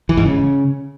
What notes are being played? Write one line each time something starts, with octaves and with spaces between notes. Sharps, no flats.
E3
G#2
C#3